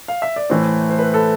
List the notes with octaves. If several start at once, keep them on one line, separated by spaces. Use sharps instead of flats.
F5
E5
D5
A2 E3 A3 C5
C5
B4
A4